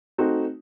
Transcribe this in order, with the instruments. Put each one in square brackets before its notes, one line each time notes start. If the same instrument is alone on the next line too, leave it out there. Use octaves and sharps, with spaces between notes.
[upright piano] A3 C4 D#4 F#4